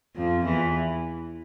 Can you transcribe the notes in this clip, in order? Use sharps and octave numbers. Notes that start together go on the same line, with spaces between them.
F2 F3
E2 E3